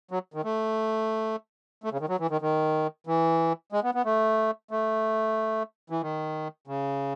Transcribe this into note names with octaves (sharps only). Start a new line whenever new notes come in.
F#3
D#3
A3
A3
C#3
D#3
F#3
E3
D#3
D#3
E3
G#3
B3
B3
A3
A3
E3
D#3
C#3